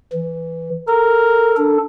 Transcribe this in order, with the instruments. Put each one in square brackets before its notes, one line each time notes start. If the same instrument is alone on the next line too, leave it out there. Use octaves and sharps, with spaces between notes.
[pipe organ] E3
[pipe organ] A4 [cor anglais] A#4
[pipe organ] D4 A4